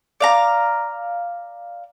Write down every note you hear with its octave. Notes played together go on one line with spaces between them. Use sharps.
D5 F5 A#5